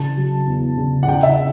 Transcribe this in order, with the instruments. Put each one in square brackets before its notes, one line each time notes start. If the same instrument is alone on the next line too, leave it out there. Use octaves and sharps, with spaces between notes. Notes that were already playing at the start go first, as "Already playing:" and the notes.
Already playing: [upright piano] C#3 A5
F#3
E2
C#3
F#5
C#3 G5
E5